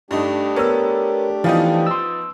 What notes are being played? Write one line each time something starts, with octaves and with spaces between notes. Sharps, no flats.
G2 A3 D4 D#4 G4
B3 A#4 C#5 A#5 E6
E3 F3 B3 D#4 F5 G5
C6 E6